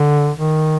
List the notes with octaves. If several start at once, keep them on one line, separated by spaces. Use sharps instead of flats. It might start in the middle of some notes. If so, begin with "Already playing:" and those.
Already playing: D3
D#3